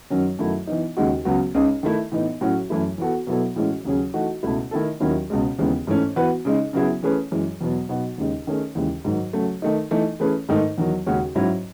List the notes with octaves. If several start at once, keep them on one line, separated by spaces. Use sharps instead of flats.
F#2 D#3 F#3 C#4
F#2 D#3 F#3 A3 E4
E3 B3 D#4
D#2 C#3 G#3 D#4 F#4
C#2 C#3 F#3 B3 F#4
C#2 C#3 G#3 D#4 G#4
D#3 A3 E4
A2 E3 B3 D#4
A2 F#3 C#4 F#4
F#2 E3 A3 E4
E3 B3 F#4 A4
B2 F#3 B3 E4 A4
A2 E3 G#3 C#4 F#4
D#2 C#3 F#3 C#4 G#4
E3 A3 D#4 F#4
C#2 B2 A3 E4
D#3 A3 E4 A4
D#2 D#3 F#3 C#4 E4
C#2 B2 G#3
D#2 C#3 E3 G#3 B3
G#2 E3 A3 C#4
E3 B3 F#4 B4
C#3 G#3 D#4
C#3 F#3 B3 E4 G#4
E3 A3 C#4 G#4 B4
F#2 E3 G#3
E2 B2 F#3 B3
B2 F#3 B3 D#4 F#4
D#2 C#3 G#3 D#4
D#3 A3 C#4 G#4
D#2 C#3 E3 G#3
G#2 D#3 F#3
C#3 F#3 A3
D#3 A3 D#4
E3 A3 D#4
E3 A3 C#4 G#4 B4
G#2 D#3 A3 D#4
E2 D#3 F#3
D#2 C#3 G#3 C#4 F#4
G#2 F#3 C#4 E4